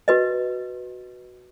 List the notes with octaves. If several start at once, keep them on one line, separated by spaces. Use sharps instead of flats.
F#4 B4 D#5